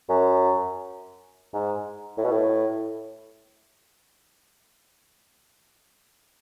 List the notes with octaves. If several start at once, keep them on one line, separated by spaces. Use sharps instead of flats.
F#2
G#2
A2
B2
A2